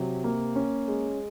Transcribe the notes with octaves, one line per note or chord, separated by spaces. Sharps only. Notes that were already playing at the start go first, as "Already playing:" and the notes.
Already playing: C3 F#3
A#3
C#4
G#3